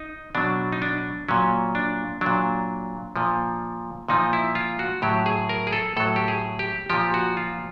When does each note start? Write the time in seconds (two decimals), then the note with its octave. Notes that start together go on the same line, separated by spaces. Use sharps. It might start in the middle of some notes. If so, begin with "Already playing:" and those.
Already playing: D#4
0.35 B2 F#3 D4
0.72 D#4
0.82 D4
1.29 A#2 F#3 C#4
1.75 D4
2.21 A#2 F#3 D4
3.16 A#2 F3
4.08 A#2 F3 D#4
4.33 E4
4.55 F4
4.79 F#4
5.02 A2 F#3 G4
5.26 G#4
5.49 A#4
5.67 G#4
5.73 A4
5.97 A2 F#3 A4
6.16 G4
6.28 G#4
6.59 G4
6.90 A#2 F3 G4
7.14 F#4
7.37 F4